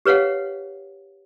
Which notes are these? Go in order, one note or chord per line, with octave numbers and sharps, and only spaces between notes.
G4 B4 C#5 F5 F#5